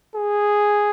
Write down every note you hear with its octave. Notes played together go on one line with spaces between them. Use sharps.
G#4